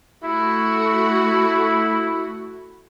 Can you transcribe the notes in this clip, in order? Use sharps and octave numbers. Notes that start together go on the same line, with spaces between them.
A3 E4 F#4